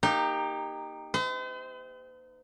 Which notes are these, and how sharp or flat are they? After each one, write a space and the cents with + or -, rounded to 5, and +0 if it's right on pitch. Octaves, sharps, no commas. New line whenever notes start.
A#3 +0 D#4 -10 G4 +15
C5 -45 D#5 +45